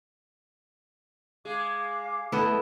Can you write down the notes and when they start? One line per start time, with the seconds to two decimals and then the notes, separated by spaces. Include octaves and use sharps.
1.45 G#3 G#4 F5 D6
2.32 A3 B3 E4 D#5